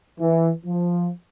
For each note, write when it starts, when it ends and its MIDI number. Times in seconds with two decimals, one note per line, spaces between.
0.19 0.50 52
0.65 1.09 53